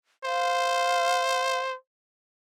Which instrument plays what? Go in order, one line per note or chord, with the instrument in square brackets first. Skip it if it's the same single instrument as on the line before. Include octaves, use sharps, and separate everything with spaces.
[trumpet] C5 [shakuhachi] F5